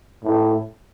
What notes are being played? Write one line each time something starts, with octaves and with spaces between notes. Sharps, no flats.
A2